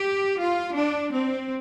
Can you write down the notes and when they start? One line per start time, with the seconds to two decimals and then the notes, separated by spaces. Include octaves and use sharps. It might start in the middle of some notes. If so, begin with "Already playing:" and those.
Already playing: G4
0.38 F4
0.74 D4
1.11 C4